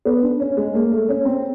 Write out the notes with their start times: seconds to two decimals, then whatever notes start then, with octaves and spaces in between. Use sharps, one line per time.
0.05 B3
0.22 D4
0.40 C#4
0.57 G#3
0.75 A#3
0.92 A3
1.09 C#4
1.25 C4